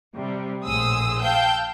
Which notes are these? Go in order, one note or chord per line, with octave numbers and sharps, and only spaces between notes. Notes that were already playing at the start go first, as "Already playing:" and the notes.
C3 G3
A#1 A2 G#4 C5 D#6 E6
F5 G5 A5 E6 G6